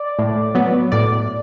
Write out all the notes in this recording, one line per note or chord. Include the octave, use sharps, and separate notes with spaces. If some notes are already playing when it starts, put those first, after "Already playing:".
Already playing: D5
A2
F#3 B3
A2 D5